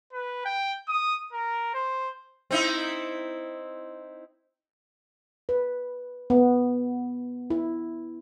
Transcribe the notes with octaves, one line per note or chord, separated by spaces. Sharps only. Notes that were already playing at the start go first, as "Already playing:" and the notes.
B4
G5
D#6
A#4
C5
C4 D#4 E4
B4
B3
E4